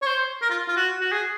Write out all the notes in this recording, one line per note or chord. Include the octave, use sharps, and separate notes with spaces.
C#5
C5
A#4
F4
F4
F#4
F#4
G#4